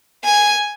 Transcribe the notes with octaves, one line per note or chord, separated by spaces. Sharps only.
G#5